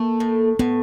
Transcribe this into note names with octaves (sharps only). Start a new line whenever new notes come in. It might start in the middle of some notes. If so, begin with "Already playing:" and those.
Already playing: A3 A#3
A2
A2 B3